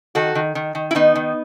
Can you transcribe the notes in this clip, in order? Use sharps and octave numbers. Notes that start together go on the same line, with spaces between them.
D#3 F#4 A4
D#3
D#3
D#3
E4
D#3 B3 D#4
D#3